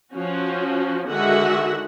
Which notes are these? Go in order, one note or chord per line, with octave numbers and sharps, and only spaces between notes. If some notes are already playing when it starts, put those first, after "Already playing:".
F3 C#4 F#4
D3 D#3 G#3 F#4 E5 F#5